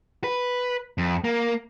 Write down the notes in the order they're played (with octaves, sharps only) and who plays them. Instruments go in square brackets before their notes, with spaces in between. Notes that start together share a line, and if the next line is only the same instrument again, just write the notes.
[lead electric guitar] B4
F2
A#3